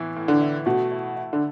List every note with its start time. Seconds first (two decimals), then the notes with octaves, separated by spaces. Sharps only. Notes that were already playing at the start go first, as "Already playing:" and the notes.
Already playing: A2 E3 B3 E4
0.16 A2
0.28 D3
0.41 E4
0.66 B2 A3
0.92 E4
1.16 E4
1.33 D3